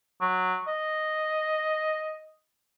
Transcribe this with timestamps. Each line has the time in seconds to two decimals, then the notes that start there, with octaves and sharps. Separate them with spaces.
0.21 F#3
0.67 D#5